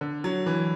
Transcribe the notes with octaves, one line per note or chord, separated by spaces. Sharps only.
D3
F#3
E3